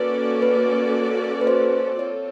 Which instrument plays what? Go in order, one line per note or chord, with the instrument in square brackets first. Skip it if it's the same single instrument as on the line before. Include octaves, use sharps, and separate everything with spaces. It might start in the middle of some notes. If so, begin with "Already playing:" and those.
Already playing: [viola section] A#3 C#4 F#4 A4 D5 [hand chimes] B4
[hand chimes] B4
B4
C5
[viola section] C4 F4 A4 [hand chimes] C#5